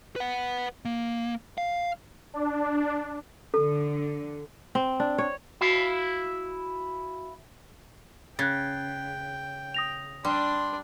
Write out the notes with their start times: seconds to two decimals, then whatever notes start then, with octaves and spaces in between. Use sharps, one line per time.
0.16 B4 F#5
0.85 A#3
1.58 F5
2.34 D4
3.54 D3 A4
4.75 C4
5.00 D4
5.18 C#5
5.61 E4 F#4 F5 E7
8.39 C#3 G5 F#6 G#6 A6
9.74 D#6 A#6 F7
10.25 G3 D4 D5 C6